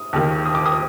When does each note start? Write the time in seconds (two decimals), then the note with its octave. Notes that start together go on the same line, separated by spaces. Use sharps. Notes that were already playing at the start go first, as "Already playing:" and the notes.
Already playing: D#6
0.13 D#2 D#3 A#3
0.45 D#6
0.55 D6
0.66 D#6